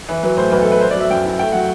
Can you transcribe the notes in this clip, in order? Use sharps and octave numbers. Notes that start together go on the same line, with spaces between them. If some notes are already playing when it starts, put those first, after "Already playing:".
E3 B4
F#3 B4
A2 C5
B1 B4
A4
A3
B4
B3 C5
D5
F#3 E5
F#2 G5
E4
A3 G5
F#3 F#5